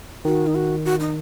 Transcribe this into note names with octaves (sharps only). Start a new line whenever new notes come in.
D#3 F#4
D#4
F#4
F#4
D#4